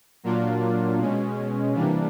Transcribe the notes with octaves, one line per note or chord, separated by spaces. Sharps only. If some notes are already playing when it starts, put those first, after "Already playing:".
A#2 F#3 A#3 D4 F4
B2 G#3 C#4
C3 E3 G3 A#3 D4